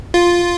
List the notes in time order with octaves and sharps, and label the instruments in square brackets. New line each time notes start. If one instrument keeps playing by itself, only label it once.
[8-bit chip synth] F4